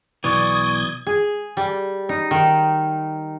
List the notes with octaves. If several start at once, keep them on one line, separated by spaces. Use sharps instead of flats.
B1 B2 E3 D5 C#6 D#6 G#6
G#4
G3
D#4
D#3